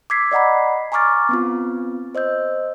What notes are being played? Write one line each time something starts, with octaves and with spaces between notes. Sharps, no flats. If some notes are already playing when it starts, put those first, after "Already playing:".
D6 E6 G#6 B6 C7
D5 D#5 F#5 A#5 B5
G#5 A#5 C#6 D6 F6 A6
B3 C4 F4
C5 D#5 E6 G6